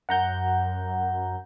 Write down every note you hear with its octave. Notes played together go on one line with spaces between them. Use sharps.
F#2 F#5 A#5 G6